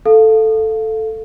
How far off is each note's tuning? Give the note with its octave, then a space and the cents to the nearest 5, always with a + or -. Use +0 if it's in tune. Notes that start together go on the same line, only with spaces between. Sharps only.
A4 +0 F5 +0